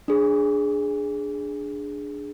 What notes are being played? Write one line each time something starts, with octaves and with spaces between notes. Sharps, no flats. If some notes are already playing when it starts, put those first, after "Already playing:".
D4 G#4